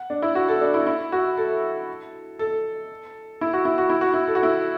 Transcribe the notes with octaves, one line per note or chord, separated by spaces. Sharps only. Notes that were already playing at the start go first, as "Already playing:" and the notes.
Already playing: F#5
D4
E4
F#4
A4
D4
E4
E4
F#4
A4
A4
E4
F#4
E4
F#4
E4
F#4
E4
A4
F#4
E4